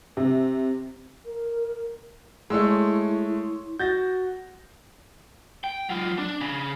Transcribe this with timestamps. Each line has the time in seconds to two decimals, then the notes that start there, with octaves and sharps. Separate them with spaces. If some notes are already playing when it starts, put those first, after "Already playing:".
0.17 C3
1.26 A#4
2.50 G#3 A3 E4 C#5 C6 E6
3.79 F#4 G6 A6 A#6
5.64 G5
5.89 F#3 F4
6.18 D4
6.41 C#3